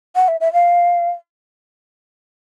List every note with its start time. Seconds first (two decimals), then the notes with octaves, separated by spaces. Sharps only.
0.15 F#5
0.28 E5
0.40 E5
0.53 F5